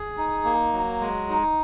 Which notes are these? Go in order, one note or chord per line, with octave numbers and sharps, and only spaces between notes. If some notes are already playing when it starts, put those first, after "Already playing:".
Already playing: G#4
D#4
A#3
F#3
G#3
D#4